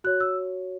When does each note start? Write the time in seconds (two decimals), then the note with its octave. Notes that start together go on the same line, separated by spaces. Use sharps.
0.04 F#4 C#5 F#6
0.20 E6